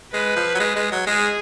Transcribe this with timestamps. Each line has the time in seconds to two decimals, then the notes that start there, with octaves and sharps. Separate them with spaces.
0.13 G#3 B4
0.36 F3
0.55 F#3
0.60 G#3
0.76 G#3
0.92 F#3
1.07 G#3 G#4